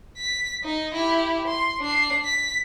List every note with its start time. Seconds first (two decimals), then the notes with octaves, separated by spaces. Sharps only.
0.17 B6
0.64 D#4
0.94 E4 G4
1.47 C6
1.81 D4 C7
2.25 B6